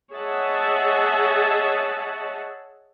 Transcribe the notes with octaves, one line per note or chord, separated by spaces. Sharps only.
G#4 C#5 D#5 E5 F#5 A5